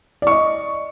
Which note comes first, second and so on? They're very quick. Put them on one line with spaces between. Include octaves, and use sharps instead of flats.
D5 C#6 D#5